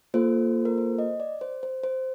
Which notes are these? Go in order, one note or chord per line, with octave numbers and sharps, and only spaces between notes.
A#3 F4 A4 C5
A#4
C5
D#5
D5
C5
C5
C5